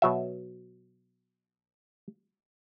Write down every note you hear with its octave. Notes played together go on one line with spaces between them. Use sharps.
B2 F#3 E5